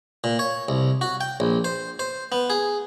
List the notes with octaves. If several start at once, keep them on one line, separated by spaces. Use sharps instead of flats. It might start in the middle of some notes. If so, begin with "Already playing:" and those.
A#2
C#5
C2
F#4
G5
A#1
C5
C5
B3
G#4